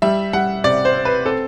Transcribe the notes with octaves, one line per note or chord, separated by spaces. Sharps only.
G3 E5
G3 F#5
C3 D5
C5
C4
B4
C4 A4